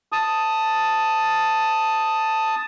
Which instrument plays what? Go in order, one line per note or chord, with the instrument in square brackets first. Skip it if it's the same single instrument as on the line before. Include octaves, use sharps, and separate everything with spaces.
[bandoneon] A5 D#6